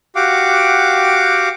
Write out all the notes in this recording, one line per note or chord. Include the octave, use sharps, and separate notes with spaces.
F#4 G4 F5 F#5 D6